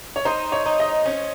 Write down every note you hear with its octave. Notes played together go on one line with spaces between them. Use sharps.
C#5
D#4 C5
C#5
D#4
D#5
C#4